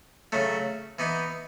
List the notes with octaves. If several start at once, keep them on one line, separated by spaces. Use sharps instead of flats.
C#3 F#3 A3
E3 B3 D#4